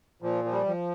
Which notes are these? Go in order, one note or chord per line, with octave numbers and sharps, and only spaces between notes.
A#2 F3
F3
G3
F3